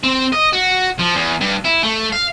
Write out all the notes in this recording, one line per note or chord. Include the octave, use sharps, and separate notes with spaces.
C4
D#5
F#4
F3
E2
G2
E4
A3
F5